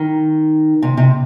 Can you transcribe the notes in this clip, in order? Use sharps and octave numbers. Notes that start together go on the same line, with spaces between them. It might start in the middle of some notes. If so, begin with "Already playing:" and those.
Already playing: D#3
C3
C3